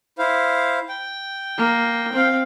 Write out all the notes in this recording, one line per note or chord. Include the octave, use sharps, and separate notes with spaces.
E4 C5 F5
G5
A#3
C4 F5